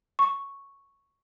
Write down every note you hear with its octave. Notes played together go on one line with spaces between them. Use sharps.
C#6